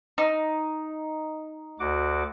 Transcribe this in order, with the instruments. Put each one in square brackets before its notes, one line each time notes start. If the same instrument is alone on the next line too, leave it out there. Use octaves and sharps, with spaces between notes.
[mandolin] D#4
[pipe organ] D2 F#4 D6